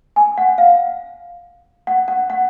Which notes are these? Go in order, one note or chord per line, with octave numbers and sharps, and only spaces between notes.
G#5
F#5
F5
F#5
F#5
F#5